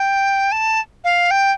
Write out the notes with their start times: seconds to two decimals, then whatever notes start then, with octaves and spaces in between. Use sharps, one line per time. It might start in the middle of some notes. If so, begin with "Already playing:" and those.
Already playing: G5
0.52 A5
1.04 F5
1.31 G5